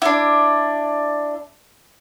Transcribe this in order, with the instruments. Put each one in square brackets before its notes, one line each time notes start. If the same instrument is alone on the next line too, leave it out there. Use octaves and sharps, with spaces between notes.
[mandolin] D4 E4